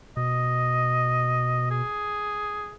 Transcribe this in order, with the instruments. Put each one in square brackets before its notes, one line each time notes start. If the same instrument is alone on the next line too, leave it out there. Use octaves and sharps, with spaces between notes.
[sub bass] B2 [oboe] D#5
[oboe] G#4